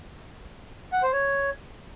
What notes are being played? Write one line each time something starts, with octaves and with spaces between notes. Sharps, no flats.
F#5
C5
C#5